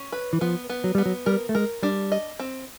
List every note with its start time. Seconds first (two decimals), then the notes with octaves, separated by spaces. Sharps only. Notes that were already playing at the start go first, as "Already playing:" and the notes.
Already playing: C#4
0.12 B4
0.33 E3
0.41 F3 B3
0.70 B3
0.84 F#3
0.95 G3 B3
1.06 F#3
1.26 G3 A#4
1.49 A3
1.55 G#3 A#4
1.83 G3 D4
2.12 D#5
2.40 C4